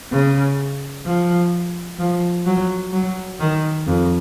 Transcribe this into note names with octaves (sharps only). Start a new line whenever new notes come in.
C#3
F3
F3
F#3
F#3
D#3
F2